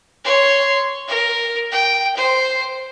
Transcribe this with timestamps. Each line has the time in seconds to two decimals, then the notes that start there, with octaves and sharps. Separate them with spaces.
0.24 C#5 C6
1.07 A#4
1.71 G5
2.16 C5